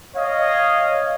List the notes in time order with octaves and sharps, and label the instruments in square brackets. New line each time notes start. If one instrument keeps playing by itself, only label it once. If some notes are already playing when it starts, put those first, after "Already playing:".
[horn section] C#5 D#5 F5